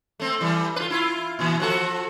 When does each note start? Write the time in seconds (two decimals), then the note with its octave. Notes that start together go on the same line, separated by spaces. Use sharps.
0.20 A3 C4
0.41 E3 G3
0.76 F4 B4
0.90 E4 F4
1.39 A#2 E3
1.60 F3 F#4 A4